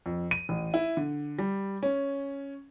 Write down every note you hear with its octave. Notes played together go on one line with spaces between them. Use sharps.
F2
D#7
A1
E4
D3
G3
C#4